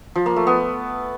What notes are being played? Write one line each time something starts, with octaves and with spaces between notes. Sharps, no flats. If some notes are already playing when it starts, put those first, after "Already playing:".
F3
A#3
A3
B3